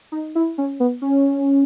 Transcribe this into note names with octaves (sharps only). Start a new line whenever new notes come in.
D#4
E4
C#4
B3
C#4